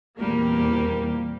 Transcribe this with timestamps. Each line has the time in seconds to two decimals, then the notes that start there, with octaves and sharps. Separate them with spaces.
0.20 E2 A#2 G3 A#3 C4